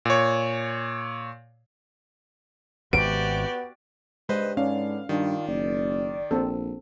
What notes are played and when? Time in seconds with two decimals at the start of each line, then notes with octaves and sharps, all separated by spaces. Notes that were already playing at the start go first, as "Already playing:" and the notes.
0.05 A#2 C#5
2.93 G#1 C3 B3 F#4 G4 D5 D7
4.29 G2 G#3 B4 C5 D#5
4.57 G#2 D3 B3 C#4 D4 F5
5.09 G2 D#3 D4 F4
5.47 F#1 D5
6.31 A#1 C4 A4